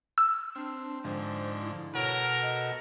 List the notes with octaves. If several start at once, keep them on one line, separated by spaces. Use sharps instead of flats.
E6
C4 D4
G#2 D3 F3 C5
E4
B2 F#4 A4 A#4 C#5
D#5